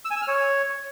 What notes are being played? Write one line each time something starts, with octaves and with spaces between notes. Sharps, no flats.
E6
G#5
E6
F6
C#5